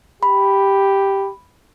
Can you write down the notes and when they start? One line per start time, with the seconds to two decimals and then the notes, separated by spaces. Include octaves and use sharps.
0.23 G4 B5